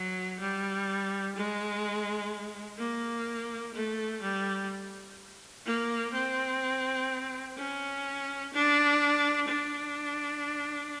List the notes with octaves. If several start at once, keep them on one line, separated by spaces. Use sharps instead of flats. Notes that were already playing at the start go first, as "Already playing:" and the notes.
Already playing: F#3
G3
G#3
A#3
A3
G3
A#3
C4
C#4
D4
D4